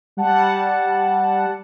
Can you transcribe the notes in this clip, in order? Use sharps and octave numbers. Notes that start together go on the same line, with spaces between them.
G3 F#5 A5